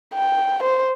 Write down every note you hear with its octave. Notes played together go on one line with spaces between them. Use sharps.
G5
C5